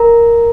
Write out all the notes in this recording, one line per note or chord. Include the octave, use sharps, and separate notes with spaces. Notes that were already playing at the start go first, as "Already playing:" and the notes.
Already playing: A#4 A#5